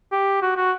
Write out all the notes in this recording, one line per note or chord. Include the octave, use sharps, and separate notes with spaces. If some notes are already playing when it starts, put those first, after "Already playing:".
G4
F#4
F#4